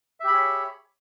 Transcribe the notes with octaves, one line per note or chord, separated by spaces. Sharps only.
G4 G#4 C#5 E5 B5